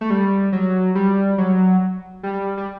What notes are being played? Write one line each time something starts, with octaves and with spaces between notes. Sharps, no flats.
A3
G3
F#3
G3
F#3
G3
G3